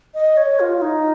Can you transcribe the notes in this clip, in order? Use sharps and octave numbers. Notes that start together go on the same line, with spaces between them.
D#5
C#5
F4
F4
D#4